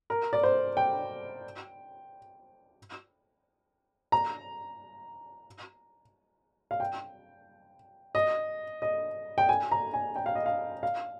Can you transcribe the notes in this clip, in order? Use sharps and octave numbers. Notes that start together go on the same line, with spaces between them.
A#4
D5
C5
G5
A#5
F5
G5
D#5
D#5
G5
G#5
A#5
G#5
G5
F5
D#5
F5
F5